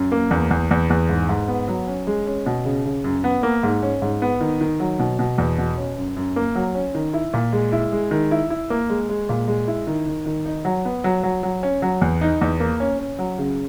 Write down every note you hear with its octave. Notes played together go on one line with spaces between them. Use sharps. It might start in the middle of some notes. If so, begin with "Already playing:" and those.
Already playing: F#2
A#3
E2
E2
E2
E2
G#2
G#2
B3
F#3
C#4
G#3
C#4
B2
C#3
C#3
F#2
B3
A#3
G#2
C#4
G#2
B3
D#3
D#3
F#3
B2
B2
E2
B2
C#4
F#2
F#2
A#3
F#3
C#4
D#3
E4
A#2
G#3
E4
G#3
D#3
E4
E4
A#3
G#3
G#3
A#2
G#3
E4
D#3
D#3
D#3
D#4
F#3
B3
F#3
F#3
F#3
C#4
F#3
E2
D#4
E2
A#3
C#4
C#4
F#3
C#3